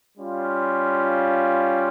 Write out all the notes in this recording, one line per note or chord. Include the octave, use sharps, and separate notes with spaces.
G3 C#4 F4